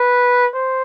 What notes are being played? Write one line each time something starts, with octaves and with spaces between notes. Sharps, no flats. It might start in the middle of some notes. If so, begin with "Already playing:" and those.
Already playing: B4
C5